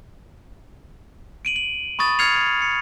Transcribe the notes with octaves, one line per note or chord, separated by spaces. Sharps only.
D7 D#7 F#7
F#7
B5 C#6 D#6 A6
F6 G#6 A6 C7 C#7 F7
G#6
C#7